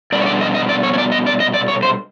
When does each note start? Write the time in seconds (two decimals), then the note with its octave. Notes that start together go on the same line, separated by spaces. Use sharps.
0.12 B2 G3 B3 D4 D5
0.22 C#5
0.26 D5
0.41 D#5
0.55 D#5
0.69 D5
0.83 C#5
0.93 C#5
0.98 D5
1.12 D#5
1.27 D5
1.40 D#5
1.54 D5
1.68 C#5
1.83 C5